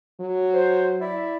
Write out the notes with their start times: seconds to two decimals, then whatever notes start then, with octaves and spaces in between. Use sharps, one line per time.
0.20 F#3
0.53 C5
1.00 E4 D5 E5